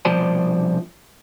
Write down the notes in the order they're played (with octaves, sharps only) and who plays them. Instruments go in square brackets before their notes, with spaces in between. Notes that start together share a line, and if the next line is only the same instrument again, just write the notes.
[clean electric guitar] C2 B2 F3 C5 D5 A5